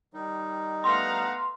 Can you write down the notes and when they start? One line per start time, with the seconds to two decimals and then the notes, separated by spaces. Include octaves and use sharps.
0.14 D#3 G3 D#4
0.84 A3 B3 F5 F#5 A#5 C6